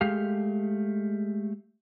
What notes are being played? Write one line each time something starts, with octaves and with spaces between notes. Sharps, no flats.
G#3 A3 G4 F5